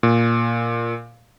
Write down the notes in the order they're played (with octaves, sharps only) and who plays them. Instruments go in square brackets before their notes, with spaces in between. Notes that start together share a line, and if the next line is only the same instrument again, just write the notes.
[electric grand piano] A#2